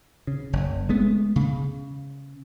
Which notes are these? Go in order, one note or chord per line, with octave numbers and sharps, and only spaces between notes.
C#3
F#1
G#3 A3 B3
C#3